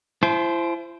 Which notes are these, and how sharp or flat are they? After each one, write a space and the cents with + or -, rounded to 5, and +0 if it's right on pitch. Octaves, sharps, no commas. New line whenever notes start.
E4 +40 C5 +0 A5 -45